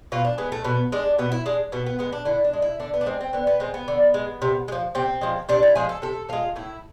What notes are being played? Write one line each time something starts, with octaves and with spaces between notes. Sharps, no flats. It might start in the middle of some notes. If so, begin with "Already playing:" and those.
B2 F4
D4
G#3 B3
A3
B2 B3
G#3 D4
B2 B3
E4
G#3 D4
B2 B3
B3
G#3 B3
D4
D3 E4
D4
G#3
E4
D3 D4
B3
D4
G#3 C4
C4
D3 B3
B3
G#3 C4
B3
D3
G#3
C3
G#3
F3
C3 C4
F3 G#3
C3 D4
E4
F3 G#3 G#4
A4
C3 A4
F3 G#3 F4
A2 E4